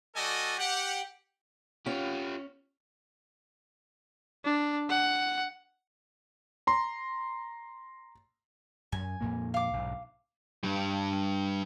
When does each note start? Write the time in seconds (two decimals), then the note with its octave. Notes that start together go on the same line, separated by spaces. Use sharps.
0.15 G3 F#4 A4 D5 D#5 G#5
0.57 G4 F#5
1.86 C#4 F4 G4
4.45 D4
4.90 F#5
6.67 A#5 C6
8.92 F#2 G#5
9.20 F2 A#2 A#3
9.54 F5 D6
9.73 B1 G#2
10.64 G2 G3